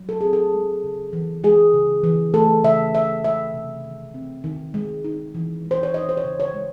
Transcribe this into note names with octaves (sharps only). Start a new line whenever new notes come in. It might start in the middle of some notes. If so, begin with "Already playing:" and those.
Already playing: F#3
A4
C4 G#4
A4
G#3
C#3
E3
G#3 G#4
C#3
E3
A3 A4
C#3 E5
E3 E5
G#3 E5
C3
D#3
C4
D#3
G#3
D#4
E3
G#3
C5
C#5
D#4 D#5
C5
C#5
C#3
C#5
G#3